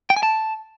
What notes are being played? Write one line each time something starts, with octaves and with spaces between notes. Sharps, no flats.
G5
G#5
A5